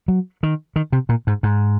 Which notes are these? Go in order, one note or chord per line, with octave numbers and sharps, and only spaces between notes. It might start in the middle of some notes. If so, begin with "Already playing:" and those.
F#3
D#3
D#3
C3
A#2
G#2
G#2